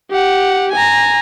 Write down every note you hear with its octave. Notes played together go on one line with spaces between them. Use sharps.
G4 F#5
G#5 A#5